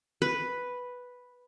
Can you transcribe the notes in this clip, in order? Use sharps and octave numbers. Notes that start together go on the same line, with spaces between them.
B4